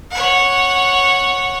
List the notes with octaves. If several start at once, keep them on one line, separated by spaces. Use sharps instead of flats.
C#5 F#5